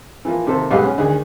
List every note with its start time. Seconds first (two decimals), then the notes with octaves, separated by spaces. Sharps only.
0.25 E3 F3 A#3
0.46 C3 D#3 A#3 A4 C5
0.71 B1 G#2 B3 G4 F5
0.83 C#4
0.98 D2 D#3 G#4